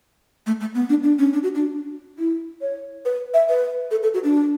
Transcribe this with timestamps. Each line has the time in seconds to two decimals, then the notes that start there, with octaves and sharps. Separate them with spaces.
0.47 A3
0.60 A3
0.75 B3
0.89 D4
1.03 D4
1.19 C#4
1.33 D4
1.43 F#4
1.55 D4
2.19 E4
2.62 C#5
3.05 B4
3.34 E5
3.49 B4
3.91 A4
4.03 A4
4.14 F#4
4.24 D4